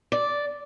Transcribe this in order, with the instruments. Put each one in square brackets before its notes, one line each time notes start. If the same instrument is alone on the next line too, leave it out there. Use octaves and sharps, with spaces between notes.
[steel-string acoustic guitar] D5